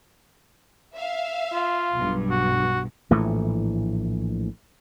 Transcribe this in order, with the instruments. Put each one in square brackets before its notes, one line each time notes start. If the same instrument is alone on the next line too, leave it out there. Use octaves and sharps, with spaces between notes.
[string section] E5 F5
[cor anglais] F4
[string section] B1 G2
[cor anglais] F#4
[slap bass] A#1 A2 E3 A3